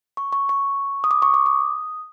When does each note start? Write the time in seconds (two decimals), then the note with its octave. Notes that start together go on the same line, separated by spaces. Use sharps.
0.17 C#6
0.32 C#6
0.49 C#6
1.04 D#6
1.11 D6
1.22 C#6
1.34 D6
1.46 D#6